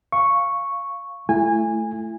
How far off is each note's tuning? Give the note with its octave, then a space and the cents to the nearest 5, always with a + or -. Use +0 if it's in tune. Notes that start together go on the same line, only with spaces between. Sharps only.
F5 +0 C#6 +0
A3 +0 E4 +25 G#5 -20